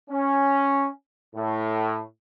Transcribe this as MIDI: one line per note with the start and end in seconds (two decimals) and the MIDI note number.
0.10 0.88 61
1.35 2.01 45